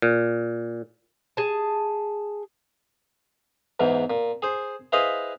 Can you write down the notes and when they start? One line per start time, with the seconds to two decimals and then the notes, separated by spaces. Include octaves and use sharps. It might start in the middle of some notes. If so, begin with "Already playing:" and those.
0.02 A#2
1.37 G#4 A5
3.80 E2 G#2 E3
4.10 A#2
4.42 G#4 C5
4.92 E4 G#4 B4 C5 D#5 F5